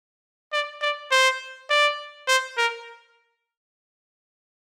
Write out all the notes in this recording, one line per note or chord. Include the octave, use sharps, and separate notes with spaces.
D5
D5
C5
D5
C5
A#4